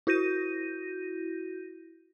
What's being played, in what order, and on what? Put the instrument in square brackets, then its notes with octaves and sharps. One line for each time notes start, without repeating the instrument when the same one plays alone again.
[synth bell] E4 F#4 G6 A#6 D#7